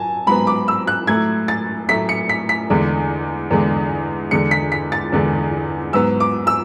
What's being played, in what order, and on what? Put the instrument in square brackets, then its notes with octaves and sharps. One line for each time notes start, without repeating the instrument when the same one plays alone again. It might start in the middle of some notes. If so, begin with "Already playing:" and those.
Already playing: [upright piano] F#3 G#5 A5
G#2 F#3 B3 B5
D6
E6
F#6
A2 F#3 A3 G#6
A6
A2 F#3 A3 B6
C#7
B6
B6
E2 D3 G#3
E2 D3 G#3
E2 D3 G#3 C#7
B6
B6
A6
E2 D3 G#3
G#2 F#3 B3 E6
D6
E6